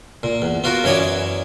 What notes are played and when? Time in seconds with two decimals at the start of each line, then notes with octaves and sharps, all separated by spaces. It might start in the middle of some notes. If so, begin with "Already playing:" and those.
0.23 A#2
0.42 E2
0.64 B3 F4 F#4 A#4
0.84 F#2 E3 E4 C#5 D5 D#6